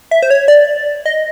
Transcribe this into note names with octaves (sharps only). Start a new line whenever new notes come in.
E5
C5
C#5
D5
D#5